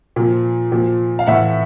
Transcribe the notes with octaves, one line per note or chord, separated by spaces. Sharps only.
A#2 F3
A#2 F3
F5
A2 E3 E5 F#5